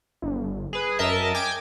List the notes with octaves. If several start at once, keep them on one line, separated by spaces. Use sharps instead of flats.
G1
G#4 B4
F#2 A#4 D#5 E5 A5
G5 G#5 D6 G#6